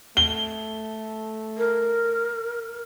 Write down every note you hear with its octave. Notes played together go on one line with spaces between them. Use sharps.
A3 G7
A#4